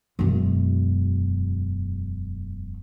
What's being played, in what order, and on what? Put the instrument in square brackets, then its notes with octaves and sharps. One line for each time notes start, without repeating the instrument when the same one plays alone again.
[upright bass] E1 F#2